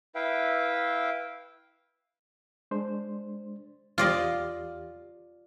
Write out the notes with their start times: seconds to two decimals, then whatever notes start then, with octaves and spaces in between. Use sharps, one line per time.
0.15 E4 B4 E5 F5 G5
2.71 G#3 D4 C5
3.98 E2 F4 G4 D5 D#5 F6